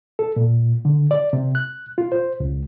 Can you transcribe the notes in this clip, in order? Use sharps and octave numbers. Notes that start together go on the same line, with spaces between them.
A4
A#2
D3
D5
C3
F#6
F4
C5
C#2